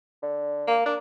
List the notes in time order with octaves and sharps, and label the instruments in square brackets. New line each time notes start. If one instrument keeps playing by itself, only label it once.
[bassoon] D3
[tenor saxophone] A#3
[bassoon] A#3 [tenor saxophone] D4